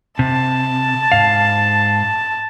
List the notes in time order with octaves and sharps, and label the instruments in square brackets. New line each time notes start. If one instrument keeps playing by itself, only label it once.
[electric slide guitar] C3 [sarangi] A5
[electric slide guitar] G#2 F5